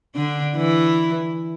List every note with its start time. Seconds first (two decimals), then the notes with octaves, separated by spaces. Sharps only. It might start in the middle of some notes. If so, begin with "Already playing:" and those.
0.16 D3 D4
0.56 E3 E4